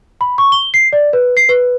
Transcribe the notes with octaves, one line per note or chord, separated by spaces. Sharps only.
B5
C#6
G7
C7
D5
B4
C7
B4